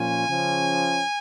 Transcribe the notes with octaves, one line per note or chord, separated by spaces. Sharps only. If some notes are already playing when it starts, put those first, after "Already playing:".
Already playing: A#2 F3 C#4 F4 G#5
C#3 F3 C#4